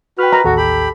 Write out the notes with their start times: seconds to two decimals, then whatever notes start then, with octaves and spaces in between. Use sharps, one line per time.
0.19 F#4 B4 G5 F6
0.33 A#5
0.45 A1 D#2 F#4 A4
0.57 G4 B5